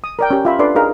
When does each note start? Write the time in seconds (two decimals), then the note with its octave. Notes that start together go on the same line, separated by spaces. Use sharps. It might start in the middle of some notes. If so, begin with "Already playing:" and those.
0.04 D#6
0.19 A#4 D5 G5
0.31 C#4 G4
0.45 F4 E5 B5
0.59 D4 A4 B4 D5 C6
0.75 D#4 G#4 A#4 F5